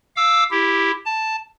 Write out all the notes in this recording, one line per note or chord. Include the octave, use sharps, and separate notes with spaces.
F5 D6 E6
E4 G4
A5